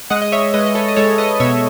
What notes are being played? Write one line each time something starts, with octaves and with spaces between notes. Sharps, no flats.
G#3 D#5 F#5
D#5
C#5 E5
G#3 B4 D#5
D#5
A4 C#5
D#5
G#3 A4 C#5
B4 D#5
B2 C#5 E5